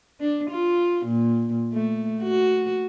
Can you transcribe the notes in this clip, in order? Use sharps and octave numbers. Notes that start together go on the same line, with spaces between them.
D4
F4
A#2
A3
F#4